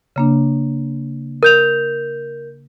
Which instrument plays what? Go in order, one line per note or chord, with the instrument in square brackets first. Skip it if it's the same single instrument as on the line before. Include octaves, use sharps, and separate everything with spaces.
[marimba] C#3 A#3 D4
[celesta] A#4 G6 F7